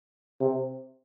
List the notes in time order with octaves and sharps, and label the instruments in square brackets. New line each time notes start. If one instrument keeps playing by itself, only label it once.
[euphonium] C3